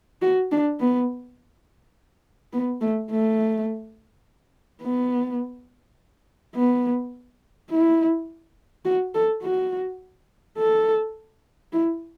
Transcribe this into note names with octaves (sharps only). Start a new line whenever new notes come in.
F#4
D4
B3
B3
A3
A3
B3
B3
E4
F#4
A4
F#4
A4
E4